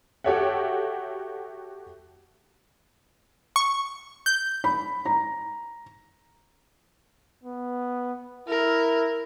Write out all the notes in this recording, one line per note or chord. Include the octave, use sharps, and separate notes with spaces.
F#4 G4 A4 C#5 E5 F#5
C#6
G6
B5
A#5
B3
E4 A#4